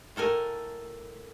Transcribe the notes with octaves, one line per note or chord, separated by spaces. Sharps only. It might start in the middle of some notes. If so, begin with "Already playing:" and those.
A2 A4 A#4 G#5